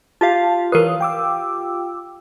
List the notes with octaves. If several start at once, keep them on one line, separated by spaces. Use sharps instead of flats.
F4 G4 F5 A5
E3 A#4 B4 C#5 D#6
G5 D6 E6